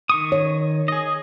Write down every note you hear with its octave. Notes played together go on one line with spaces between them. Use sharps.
D#3 C#6 D#6
C#5
G#4 D#5